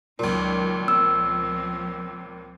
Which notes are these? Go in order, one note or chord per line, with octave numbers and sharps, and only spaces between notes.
C#2 A#2 D#3 F#3
F3 C4 E6